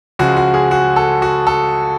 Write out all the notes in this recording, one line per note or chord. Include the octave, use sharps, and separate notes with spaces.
C#2 C#3 F3 G#3 F#4
F#4
G#4
F#4
A4
F#4
A4